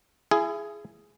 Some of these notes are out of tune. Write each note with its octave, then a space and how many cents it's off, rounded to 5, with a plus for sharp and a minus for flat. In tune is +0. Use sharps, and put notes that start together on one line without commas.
E4 +35 G#4 +5